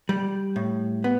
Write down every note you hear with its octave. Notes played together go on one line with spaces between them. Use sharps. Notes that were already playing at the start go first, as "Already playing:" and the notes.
G3
A2
B3